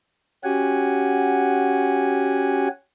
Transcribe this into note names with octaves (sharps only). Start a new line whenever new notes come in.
C#4 F#4 G4 F#5 G#5